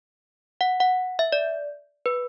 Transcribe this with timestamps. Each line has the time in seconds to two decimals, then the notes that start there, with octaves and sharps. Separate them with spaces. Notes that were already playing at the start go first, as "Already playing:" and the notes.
0.61 F#5
0.80 F#5
1.19 E5
1.32 D5
2.06 B4